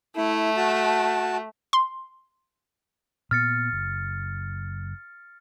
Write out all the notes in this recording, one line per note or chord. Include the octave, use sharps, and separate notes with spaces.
A3 E4
F#4 A5
C6
A#2 B3 F6 A6 C#7
F#1